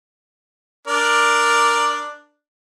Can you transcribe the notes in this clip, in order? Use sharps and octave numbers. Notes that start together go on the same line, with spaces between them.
D4 A#4 D5